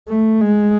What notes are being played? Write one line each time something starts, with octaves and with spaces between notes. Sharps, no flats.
A3
G#3